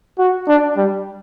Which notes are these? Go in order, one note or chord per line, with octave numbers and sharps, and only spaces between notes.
F#4
D4
G3